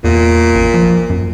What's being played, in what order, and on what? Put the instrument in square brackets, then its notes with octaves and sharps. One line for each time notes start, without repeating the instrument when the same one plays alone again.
[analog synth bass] E2 [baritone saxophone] A#2
[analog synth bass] A1
F3
F#2